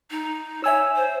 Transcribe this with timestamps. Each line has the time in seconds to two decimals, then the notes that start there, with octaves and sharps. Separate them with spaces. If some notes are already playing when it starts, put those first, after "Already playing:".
0.11 D#4
0.64 C#5 E5 G#5 E6
0.96 C5